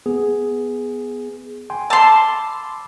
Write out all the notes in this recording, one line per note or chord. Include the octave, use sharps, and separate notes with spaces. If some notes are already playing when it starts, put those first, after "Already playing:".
B3 G#4
G5 G#5 C6
A5 B5 C6 D6 E6